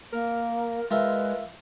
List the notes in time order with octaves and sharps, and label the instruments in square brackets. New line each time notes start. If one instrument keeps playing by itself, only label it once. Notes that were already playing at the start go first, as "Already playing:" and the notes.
[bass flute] A#3 [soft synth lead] A#4
[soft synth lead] G#3 [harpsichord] F4 A#4 E5 [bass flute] B4